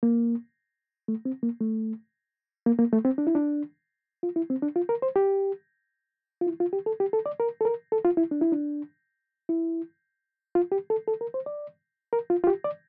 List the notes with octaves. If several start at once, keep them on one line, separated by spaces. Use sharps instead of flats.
A#3
A3
C4
A#3
A3
A#3
A#3
A3
C4
D4
E4
D4
F4
E4
C4
D4
F4
A#4
C5
G4
F4
E4
F4
G4
A4
G4
A4
D5
A#4
A4
A#4
A4
F4
E4
D4
E4
D4
E4
F4
G4
A4
A4
A#4
C5
D5
A#4
F4
F4
G4
D5